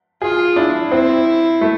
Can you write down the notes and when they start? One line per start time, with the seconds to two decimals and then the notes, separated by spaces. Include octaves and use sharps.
0.22 F4 G#4
0.56 D4 E4
0.91 C4 E4
1.61 A3